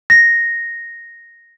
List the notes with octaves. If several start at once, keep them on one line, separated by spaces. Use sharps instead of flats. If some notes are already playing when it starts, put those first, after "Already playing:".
A#6